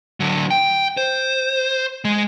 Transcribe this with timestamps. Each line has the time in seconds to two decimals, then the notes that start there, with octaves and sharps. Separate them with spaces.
0.20 D3 F#3
0.51 G5
0.97 C5
2.05 G#3